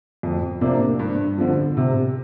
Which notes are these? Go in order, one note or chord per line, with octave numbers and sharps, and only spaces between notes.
F2
C3 F3 A#3 D4
G2
D3 F3
C3